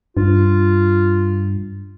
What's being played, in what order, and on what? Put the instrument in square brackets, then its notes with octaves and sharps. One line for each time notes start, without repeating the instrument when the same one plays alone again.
[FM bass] G2 [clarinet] F4